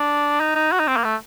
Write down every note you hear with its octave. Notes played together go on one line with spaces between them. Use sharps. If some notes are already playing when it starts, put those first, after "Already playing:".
Already playing: D4
D#4
D#4
F#4
D#4
C4
A#3
A3